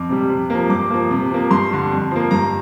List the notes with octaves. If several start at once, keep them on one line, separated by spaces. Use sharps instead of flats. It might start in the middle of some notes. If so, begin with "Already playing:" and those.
Already playing: F2 D6
C3 G3
C3
F3 A#3
G2 D6
F3 A#3
C3
F3 A#3
G2 C6
D3 G3
F2
F3 A#3
G2 A#5